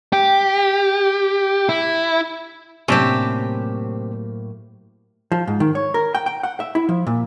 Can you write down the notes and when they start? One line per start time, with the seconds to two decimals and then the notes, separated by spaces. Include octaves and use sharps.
0.13 G4
1.69 E4
2.88 A2 C3 F#3 A#3 C#4 D4 G4
5.32 F3
5.47 G#2
5.60 D#3
5.75 C#5
5.94 A#4
6.15 G5
6.26 G5
6.43 F#5
6.60 E5
6.75 E4
6.89 F3
7.07 A#2